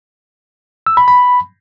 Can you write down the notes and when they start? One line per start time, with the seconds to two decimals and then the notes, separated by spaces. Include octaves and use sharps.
0.87 E6
0.97 B5
1.08 B5